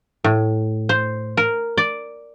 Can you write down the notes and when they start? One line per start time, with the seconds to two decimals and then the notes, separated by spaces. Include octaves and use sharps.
0.24 A2
0.89 C5
1.37 A#4
1.77 D5